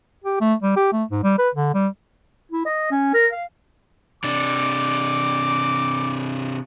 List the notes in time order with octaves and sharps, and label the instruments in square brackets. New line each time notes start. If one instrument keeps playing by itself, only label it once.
[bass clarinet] G4
A3
G3
G4
A3
G#2
G3
B4
D3
G3
[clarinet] E4
D#5
C#4
A#4
F5
[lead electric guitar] C3 D4 [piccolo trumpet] D6